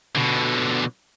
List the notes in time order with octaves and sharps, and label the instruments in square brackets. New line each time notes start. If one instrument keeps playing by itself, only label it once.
[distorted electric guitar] B2 D3